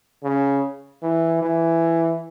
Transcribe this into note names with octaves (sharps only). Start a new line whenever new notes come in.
C#3
E3
E3